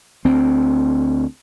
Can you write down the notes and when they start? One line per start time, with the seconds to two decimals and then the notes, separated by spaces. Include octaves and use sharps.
0.25 D2 C4